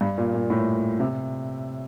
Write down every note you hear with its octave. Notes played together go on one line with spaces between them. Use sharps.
G2
A#2
A#2
A2
C3